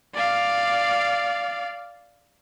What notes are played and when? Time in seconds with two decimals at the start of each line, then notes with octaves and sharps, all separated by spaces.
0.15 D5 F5